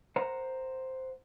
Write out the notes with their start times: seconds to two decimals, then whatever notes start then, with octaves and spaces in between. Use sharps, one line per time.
0.16 A#4 C5 F#5 A#5